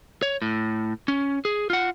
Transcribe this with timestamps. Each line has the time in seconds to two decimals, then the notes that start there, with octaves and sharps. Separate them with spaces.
0.22 C#5
0.42 A2
1.08 C#4
1.45 G#4
1.70 F4 F#5